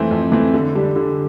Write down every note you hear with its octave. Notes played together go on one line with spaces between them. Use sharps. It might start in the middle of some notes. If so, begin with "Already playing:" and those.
Already playing: F2 E3 A3 C4
F2
E3 A3 C4
D3
G3 D4 G4
D3